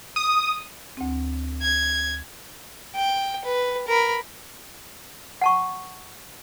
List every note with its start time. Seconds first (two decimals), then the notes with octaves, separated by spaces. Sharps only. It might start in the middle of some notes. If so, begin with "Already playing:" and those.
0.16 D#6
0.97 D2 C4
1.62 G#6
2.95 G5
3.45 B4
3.88 A#4 B5
5.41 F#5 A5 C#6